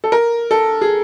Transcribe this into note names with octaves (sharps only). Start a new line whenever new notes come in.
A4
A#4
A4
G#4